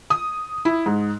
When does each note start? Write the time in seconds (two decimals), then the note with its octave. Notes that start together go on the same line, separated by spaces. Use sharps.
0.10 D#6
0.65 E4
0.86 G#2